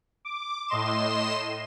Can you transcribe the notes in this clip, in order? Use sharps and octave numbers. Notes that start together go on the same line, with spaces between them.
D6
A2 D#5 C6 E7